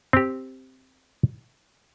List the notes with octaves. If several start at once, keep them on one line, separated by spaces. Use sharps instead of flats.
C4 G4